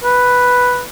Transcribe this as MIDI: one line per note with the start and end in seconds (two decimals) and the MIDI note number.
0.04 0.83 71